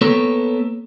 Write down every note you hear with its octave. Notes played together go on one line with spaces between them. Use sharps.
A#3 B3 A4 B4 C#5